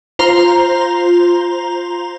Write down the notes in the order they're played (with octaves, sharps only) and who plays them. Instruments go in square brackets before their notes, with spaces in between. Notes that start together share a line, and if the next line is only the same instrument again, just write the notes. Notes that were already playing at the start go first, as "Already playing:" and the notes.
[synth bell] F4 C5 A#5